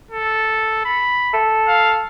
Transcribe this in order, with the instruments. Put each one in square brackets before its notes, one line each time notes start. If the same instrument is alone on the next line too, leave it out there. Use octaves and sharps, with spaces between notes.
[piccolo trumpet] A4
B5
[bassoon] A4
[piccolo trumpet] F5